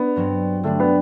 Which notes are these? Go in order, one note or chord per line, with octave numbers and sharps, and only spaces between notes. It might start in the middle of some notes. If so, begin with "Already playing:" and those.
Already playing: B3 D4
G2 F#3 C4
D3 G3 A3 D4
B3